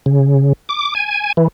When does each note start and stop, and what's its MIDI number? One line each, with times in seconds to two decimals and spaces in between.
0.06 0.53 49
0.69 0.94 86
0.95 1.32 80
1.37 1.48 52